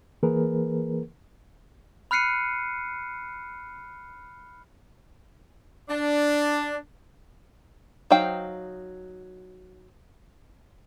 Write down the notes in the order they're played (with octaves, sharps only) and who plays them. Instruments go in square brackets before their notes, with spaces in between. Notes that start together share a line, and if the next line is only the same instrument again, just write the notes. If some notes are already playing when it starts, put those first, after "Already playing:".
[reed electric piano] E3 A#3 G#4 A#4 B4
[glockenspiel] B5 F6 F#6 C7 C#7 D#7
[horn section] D4
[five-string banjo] F#3 D#4 C5 F5 G5